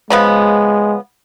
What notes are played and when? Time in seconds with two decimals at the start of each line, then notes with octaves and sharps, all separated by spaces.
0.10 C#3 F3 G#3 B3